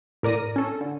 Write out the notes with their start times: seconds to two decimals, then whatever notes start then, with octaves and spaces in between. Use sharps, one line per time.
0.23 A2 A#4 D5 A#6 D#7
0.56 C#4 A4
0.81 D3